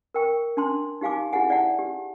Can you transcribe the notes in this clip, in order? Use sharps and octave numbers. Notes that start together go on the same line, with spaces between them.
A#4 G5 C#6
D4 A5 C6
D#4 G4 F5 G#5 D6
E4 G4 G#4 F#5 G#5
D5 E5 F#5 A5
G4